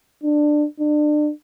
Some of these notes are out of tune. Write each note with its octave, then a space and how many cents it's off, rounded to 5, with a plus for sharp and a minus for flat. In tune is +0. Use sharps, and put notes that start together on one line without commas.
D4 +15
D4 +30